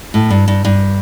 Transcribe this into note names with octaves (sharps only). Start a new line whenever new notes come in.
A2
G2
G2
G2